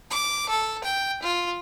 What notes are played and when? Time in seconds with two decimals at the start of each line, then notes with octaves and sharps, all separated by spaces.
0.11 D6
0.49 A4
0.84 G5
1.23 F4